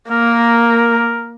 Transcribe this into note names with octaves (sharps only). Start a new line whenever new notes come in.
A#3 A#4